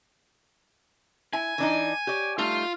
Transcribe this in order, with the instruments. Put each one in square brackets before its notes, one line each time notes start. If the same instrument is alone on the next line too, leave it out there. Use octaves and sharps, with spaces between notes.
[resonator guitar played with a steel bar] E4 [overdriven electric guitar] G#5
[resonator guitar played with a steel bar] E3 D4 D#4
G4 C#5 D5
[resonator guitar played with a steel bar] G3 A3 D#4 [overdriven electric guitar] F4